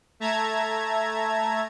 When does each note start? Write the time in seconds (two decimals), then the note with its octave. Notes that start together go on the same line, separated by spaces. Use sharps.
0.20 A3 E5 A5 A#5 G#6